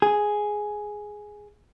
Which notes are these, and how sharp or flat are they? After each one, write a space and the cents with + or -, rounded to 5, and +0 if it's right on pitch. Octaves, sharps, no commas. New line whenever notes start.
G#4 +5